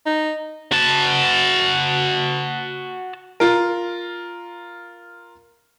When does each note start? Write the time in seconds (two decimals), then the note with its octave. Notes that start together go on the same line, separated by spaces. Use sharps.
0.06 D#4
0.72 F#4 A5
3.40 F4 A#4